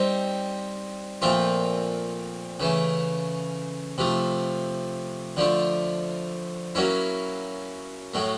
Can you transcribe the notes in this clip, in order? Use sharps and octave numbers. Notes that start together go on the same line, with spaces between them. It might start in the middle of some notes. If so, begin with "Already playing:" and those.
Already playing: G3 C4 D#4
A#2 F3 A3 C4 F4
C#3 E3 A3
C3 F3 A3
D3 F3 A3 D4
F#3 A#3 C#4 E4
A2 F#3 A3